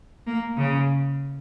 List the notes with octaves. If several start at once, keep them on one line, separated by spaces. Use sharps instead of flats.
A#3
C#3